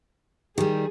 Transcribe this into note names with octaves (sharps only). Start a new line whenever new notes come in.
D#3 G3 G4 G#4